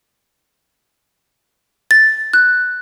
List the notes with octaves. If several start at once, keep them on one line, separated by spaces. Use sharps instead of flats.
A6
F#6